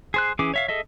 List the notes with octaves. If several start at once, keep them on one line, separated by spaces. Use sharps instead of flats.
G#4 C5 F#6
E3 C#4 G#4 D6
C#5 E5 F5
G#4 A4 D#5 E5